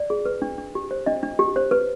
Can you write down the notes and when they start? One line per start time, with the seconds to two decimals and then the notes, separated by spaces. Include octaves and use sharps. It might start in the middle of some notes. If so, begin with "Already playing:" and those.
Already playing: D5
0.10 G#4
0.25 B4
0.42 D4
0.58 D4
0.75 G4
0.91 C5
1.06 D4 D#5
1.23 D4
1.39 G4
1.56 C5
1.71 B4